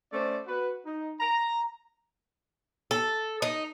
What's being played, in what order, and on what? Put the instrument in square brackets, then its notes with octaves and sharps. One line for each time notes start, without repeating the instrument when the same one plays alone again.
[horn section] A3 C#4 C5 D5
F#4 B4
D#4
A#5
[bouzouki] A4
D#4